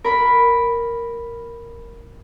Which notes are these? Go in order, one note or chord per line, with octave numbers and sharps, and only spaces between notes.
A#4 B5